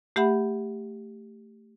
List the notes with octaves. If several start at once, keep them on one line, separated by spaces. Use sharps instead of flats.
A3 G4 E5 F#5 B5